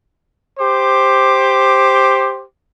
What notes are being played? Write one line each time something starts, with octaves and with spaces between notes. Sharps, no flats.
G4 C5 D6